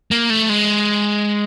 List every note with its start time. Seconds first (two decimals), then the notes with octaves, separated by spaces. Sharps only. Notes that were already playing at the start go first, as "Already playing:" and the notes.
0.11 A#3
0.30 A3
0.49 G#3